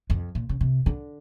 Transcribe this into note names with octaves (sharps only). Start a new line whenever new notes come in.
F2
A#2
C#3
C3
D3